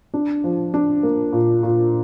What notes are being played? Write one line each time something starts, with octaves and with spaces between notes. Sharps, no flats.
D4
F3
D4
A#3
A#2
A#2